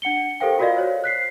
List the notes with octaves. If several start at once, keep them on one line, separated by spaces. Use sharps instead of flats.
D4 F#5 C#7 G7
G4 A4 A#4 C5 F5 G5
F4 F#4 A#4 D5 D#5 F5
C5 C#5
F#6 B6 C7